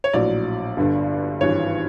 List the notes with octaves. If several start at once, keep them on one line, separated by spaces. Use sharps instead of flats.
C#5
A#1 A2 F#3 D5
G1 G2 D3
G#1 G2 E3 C#5